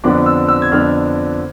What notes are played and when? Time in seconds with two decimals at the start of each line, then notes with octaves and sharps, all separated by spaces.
0.04 F2 D3 F3 B3 D4 D6
0.26 E6
0.49 E6
0.62 G#6
0.71 F2 D3 F3 B3 D4 F6